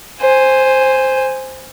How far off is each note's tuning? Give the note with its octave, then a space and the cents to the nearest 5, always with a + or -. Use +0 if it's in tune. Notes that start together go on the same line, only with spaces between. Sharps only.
C5 +0 G#5 -10